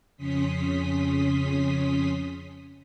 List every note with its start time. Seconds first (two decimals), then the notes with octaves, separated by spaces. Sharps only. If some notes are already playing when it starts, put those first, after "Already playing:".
0.17 F2 C#3 C#4 C6 D#6 B6